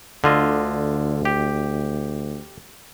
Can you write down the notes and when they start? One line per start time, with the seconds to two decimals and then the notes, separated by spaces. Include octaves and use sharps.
0.24 D2 D3 F4 D#5
1.25 G4